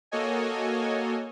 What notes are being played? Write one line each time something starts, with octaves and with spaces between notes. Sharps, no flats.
A#3 F#4 A4 C#5 D#5 G#5